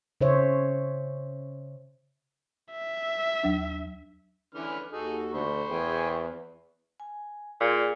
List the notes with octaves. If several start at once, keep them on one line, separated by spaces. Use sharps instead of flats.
C#3 C5 C#5 E5
E5
D#2 F#3 D4
D3 E3 C#4 E4 B4 F6
D#2 D#4 F#4 G#4 A4
D2 C5 B5 C#6
E2 G#4 G5 G#5
G#5
A#2 G#4 D5